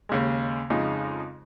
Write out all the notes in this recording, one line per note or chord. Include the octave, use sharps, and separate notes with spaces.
D#2 C#3 G#3
F2 C#3 G#3 D#4